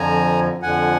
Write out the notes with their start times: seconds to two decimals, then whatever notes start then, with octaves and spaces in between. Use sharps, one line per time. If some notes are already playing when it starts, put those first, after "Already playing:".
Already playing: F2 D3 F3 G#5 A#5
0.62 F2 D3 F3 F#5 G#5